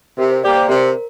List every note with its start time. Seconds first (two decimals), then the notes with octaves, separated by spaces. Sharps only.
0.18 C3 A#4
0.32 C5
0.44 A#3 G4 D5
0.57 C5
0.69 C3 A#4